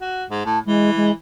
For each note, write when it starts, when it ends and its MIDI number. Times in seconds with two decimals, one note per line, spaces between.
0.01 0.24 66
0.30 0.41 44
0.46 0.59 45
0.46 0.59 81
0.66 1.11 52
0.66 0.91 56
0.97 1.11 56